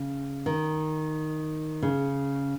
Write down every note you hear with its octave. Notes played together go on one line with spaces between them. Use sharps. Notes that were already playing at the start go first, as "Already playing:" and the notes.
Already playing: C#3
D#3
C#3